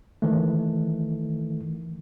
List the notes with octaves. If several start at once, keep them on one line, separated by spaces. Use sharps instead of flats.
D#3 E3 A3